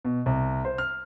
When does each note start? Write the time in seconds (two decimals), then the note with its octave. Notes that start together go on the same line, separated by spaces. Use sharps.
0.05 B2
0.26 C2
0.65 C5
0.78 F6